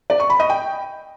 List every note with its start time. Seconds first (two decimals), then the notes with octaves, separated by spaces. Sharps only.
0.10 D5
0.20 C#6
0.30 B5
0.40 D#5
0.50 G5